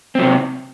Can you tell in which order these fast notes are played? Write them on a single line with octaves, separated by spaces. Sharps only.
C4 F#3 C3